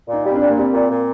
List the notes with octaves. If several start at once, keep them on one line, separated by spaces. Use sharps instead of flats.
A#2 D#4
G3
C4
D4
A#2
A#3
G3 C4
A#2
A#2